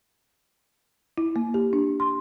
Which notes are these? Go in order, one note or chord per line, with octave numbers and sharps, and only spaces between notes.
E4
A#3
G4
D4
C6